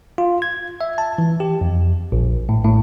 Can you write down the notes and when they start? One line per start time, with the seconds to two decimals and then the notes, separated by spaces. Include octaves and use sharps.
0.18 F4
0.42 G#6
0.81 E5
0.98 A5
1.18 E3
1.40 G4
1.61 F2
2.12 A#1
2.49 A2
2.64 A2